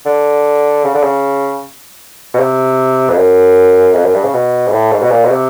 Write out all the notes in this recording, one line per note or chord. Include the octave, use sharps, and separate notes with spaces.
D3
C#3
D3
C#3
B2
C3
F2
F#2
F2
F#2
G2
C#3
B2
G#2
A2
G#2
B2
A#2
B2
C3